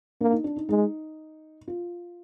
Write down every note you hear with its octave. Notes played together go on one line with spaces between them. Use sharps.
A#3 D4
D#4
D4
D#4
G#3 D#4
F4